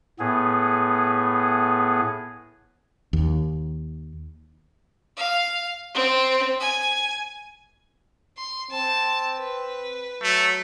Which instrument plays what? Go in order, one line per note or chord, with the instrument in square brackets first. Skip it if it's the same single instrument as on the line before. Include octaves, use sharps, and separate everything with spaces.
[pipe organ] A2 B3 G#4
[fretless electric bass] D#2
[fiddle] F5
C4
G#5
C6
[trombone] C4 [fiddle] A5
[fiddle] B4
[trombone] F#3 [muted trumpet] A3